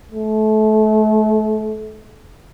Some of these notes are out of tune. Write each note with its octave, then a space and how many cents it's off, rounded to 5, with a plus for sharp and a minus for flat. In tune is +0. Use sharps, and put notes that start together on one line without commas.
A3 -30